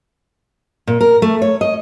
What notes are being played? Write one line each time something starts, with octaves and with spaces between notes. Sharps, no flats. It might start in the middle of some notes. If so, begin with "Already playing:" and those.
A#2
A#4
A3
C#5
D#5